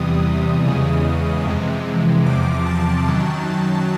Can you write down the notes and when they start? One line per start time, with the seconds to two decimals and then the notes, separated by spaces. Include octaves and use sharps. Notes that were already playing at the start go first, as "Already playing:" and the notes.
Already playing: E2 C3 E3 G3 D#6
0.64 E2 C#3 E3 G#3 D#6
1.45 F2 C3 E3 G#3
2.25 E2 C3 F3 D6
2.66 A5
3.07 F#2 D#3 F#3